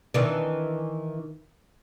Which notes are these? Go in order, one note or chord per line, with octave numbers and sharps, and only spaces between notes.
D#3 E3 D4